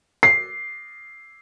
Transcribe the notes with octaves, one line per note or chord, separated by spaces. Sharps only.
C7